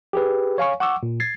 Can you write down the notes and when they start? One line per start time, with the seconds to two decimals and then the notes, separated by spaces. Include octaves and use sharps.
0.13 G4 G#4 B4
0.58 C#5 F5 G#5 C#6
0.80 F#5 C#6 D6 E6
1.03 A#2
1.20 G#6 A6 C7